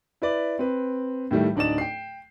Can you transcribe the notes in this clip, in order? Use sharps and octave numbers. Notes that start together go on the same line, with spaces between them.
E4 B4 D5
C4 B4
A2 D#3 G3 A3
D1 D4 D#4 D5 E7
G5 C7